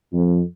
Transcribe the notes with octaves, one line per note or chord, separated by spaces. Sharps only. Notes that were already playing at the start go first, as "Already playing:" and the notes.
F2